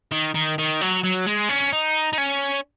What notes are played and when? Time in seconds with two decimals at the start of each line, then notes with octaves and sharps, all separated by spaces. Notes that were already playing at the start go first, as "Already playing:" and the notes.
0.12 D#3
0.34 D#3
0.58 D#3
0.81 F#3
1.03 F#3
1.26 G#3
1.49 C#4
1.72 D#4
2.13 D#4
2.18 C#4